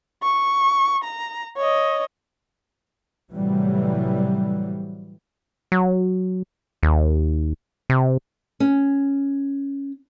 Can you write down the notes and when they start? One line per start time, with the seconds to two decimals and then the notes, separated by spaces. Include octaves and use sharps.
0.23 C#6
1.04 A#5
1.57 C#5 D#5
3.34 A2 C3 E3 F#3 G3
5.72 F#3
6.83 D#2
7.90 C3
8.60 C#4